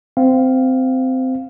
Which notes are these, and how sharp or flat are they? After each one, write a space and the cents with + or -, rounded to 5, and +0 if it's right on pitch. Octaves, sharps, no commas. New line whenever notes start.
C4 -15 F5 +0